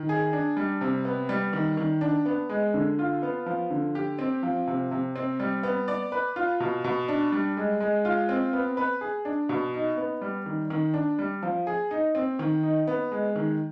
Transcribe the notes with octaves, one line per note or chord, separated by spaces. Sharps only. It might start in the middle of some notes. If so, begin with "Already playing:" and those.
Already playing: D#3
G#4
D4
G3
C3
B3
G3
D#3
D#3
D4
B3
G#3
D3
F4
B3
F3
D3
G4
C4
F3
C3
C3
C4
G3
B3
D5
B4
F4
B2
B2
D4
G3
G#3
G#3
F4
C4
B3
B4
G#4
D4
B2
D#4
B3
G3
D#3
D#3
D4
G3
F3
G#4
D#4
C4
D#3
D#4
B3
G#3
D#3